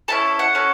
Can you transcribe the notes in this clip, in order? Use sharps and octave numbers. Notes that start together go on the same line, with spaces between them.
C#4 E4 A4 A5
F#5
C#4 F#4 A4